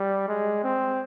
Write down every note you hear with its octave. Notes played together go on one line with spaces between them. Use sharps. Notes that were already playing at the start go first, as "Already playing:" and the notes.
Already playing: G3
G#3
C4